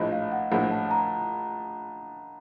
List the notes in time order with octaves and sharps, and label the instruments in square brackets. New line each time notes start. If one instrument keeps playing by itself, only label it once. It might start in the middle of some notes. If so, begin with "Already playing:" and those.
Already playing: [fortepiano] A#1 A2 F3 [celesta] D#5
[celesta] F5
F#5
[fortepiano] A#1 A2 F3 [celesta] F#5
[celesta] A5
A#5